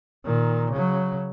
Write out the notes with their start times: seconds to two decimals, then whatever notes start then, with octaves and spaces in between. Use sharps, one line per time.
0.25 A#2 D#3
0.72 C#3 F#3